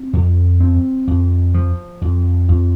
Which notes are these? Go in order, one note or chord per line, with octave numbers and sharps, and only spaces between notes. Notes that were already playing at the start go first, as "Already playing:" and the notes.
Already playing: C4
F2
C4
F2
F3
F2
F2